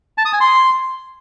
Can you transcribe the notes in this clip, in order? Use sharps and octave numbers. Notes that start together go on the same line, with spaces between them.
A5
D#6
G#5
C6